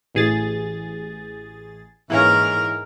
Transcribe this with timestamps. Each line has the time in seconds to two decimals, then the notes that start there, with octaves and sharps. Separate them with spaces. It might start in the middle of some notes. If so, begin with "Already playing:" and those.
0.15 A1 G#4 A6
2.10 G#2 E3 A#3 C#4 A#4